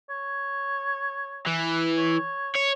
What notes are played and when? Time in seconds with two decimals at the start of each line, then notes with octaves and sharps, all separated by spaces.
0.09 C#5
1.47 E3
1.98 C#5
2.56 C#5